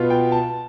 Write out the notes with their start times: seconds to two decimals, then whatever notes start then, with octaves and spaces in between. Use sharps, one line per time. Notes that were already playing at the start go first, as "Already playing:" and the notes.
Already playing: B2 B3 F4
0.10 G5
0.32 A5